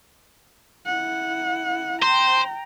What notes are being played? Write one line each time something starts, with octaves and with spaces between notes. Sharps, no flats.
E4 F#5
C5 G5 A#5